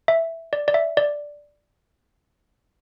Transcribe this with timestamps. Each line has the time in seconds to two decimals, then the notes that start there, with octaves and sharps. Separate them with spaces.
0.08 E5
0.53 D5
0.68 D5
0.74 E5
0.97 D5